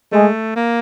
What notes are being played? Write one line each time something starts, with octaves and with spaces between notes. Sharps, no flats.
G#3 A3
A#3